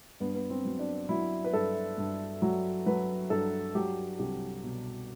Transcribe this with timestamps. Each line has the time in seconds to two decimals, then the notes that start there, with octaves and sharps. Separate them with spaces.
0.20 G2 B3
0.34 B3
0.50 C4
0.65 F#3
0.79 D4
1.09 F#3 E4
1.44 B4
1.53 G2 A4
1.98 G2
2.42 F#3
2.86 F#3 B4
3.30 G2 A4
3.75 F#3 G4
4.19 C2 G4
4.64 B2